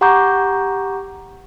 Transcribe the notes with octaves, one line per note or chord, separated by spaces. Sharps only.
G4 F#5 A#5 C#6 D6 G6